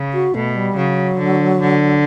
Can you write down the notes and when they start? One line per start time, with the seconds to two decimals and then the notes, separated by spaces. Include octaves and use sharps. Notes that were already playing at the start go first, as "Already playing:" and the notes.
Already playing: C#3
0.14 F#4
0.35 B2 A3
0.55 G3
0.77 C#3 F#3
1.18 D3
1.60 D3